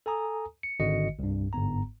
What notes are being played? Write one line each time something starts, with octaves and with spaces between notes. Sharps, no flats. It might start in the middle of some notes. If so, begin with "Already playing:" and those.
A4 G#5 A#5 D#6
C#7
G#1 D3 F#4 D#5 C#7
C2 G2
G1 G#2 B3 A#5